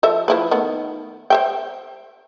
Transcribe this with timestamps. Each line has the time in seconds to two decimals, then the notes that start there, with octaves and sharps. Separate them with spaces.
0.03 F3 A4 E5
0.28 F3 E4 B4
0.51 D#3 A3 B3
1.30 C5 E5 G5